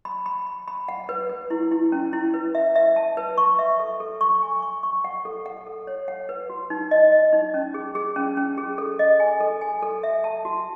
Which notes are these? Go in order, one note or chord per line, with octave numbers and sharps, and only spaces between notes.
B5
B5
B5
B5
F#5
B4
B4
E4
E4
C#4
E4
B4
E5
E5
A5
B4
C#6
E5
A4
A4
C#6
G#5
C#6
C#6
F#5
A4
F#5
A4
C#5
F#5
B4
F#4
D#4
D#5
D#5
D#4
C#4
G#4
G#4
C#4
C#4
G#4
A4
D#5
G#5
A4
G#5
A4
E5
A5
F#4